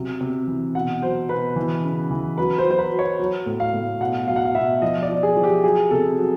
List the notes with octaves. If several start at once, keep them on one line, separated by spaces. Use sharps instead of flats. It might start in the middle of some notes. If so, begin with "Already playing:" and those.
Already playing: C3 F#3
C3
E3
B2 F#5
F#3 C5
B2 B4
E3
C#3
E3
F#3 B4
C5
F#3
C5
B4
F#3
C#5
F#3
A2
F5
A2
B2 F#5
F#3 F5
F#5
F5
B2 E5
F3 D#5
D5
F3
G#4
F3
G4
F#3 G#4
C3 A4
F#3